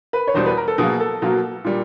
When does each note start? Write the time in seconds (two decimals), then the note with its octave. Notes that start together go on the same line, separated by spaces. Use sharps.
0.13 B4
0.27 C#5
0.34 E2 B2 G3 C5
0.46 B4
0.57 A#4
0.68 A4
0.78 B2 F#3 A#3 G#4
1.00 A4
1.22 B2 F#3 A#3
1.64 A#2 G3